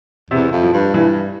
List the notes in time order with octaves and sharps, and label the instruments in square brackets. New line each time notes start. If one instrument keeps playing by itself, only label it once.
[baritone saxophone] E2 [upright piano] C3
[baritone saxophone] F2
[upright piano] F3
[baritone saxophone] G2
[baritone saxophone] G2 [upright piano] E3